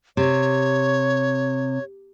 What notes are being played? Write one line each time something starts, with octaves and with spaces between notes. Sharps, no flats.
C3 C#5